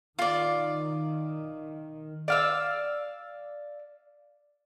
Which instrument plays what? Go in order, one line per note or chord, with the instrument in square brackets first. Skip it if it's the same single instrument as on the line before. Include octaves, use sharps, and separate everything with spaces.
[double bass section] D#3 [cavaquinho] F4 D5
[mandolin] D5 F5 E6